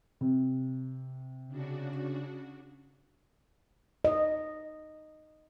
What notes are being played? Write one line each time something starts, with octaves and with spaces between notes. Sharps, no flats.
C3
C#3 D4 F#4
D#5